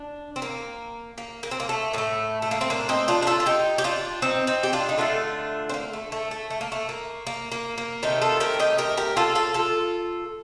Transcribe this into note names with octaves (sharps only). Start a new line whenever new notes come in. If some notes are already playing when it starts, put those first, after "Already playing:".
Already playing: D4
C4
A#3
A#3
A#3
C4
A#3
A3
A2 A3 A#3
A3
A#3
C4
A#3 D4
C4 D#4
D4 F4
A#4
F4 A4
F4
D#4 G4
G4
D4 F4
C4 D#4
C4 D#4
G4
D4 F4
D#4
D3 A3 D4 F4
C4
A#3
A3
A3
A3
A3
A#3
A3
A#3
A#3
A#3
A#3
C3 D#3 A3 D#4 G4
F4 A4
G4 A#4
D#4 G4
G4 A#4
G4 A#4
F4 A4
F4 A4
F4 A4